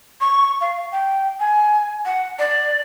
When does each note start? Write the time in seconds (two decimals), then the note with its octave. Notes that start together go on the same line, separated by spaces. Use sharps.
0.21 C#6
0.61 F5
0.92 G5
1.40 G#5
2.05 F#5
2.39 D5